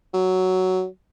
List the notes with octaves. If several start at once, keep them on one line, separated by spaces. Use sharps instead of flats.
F#3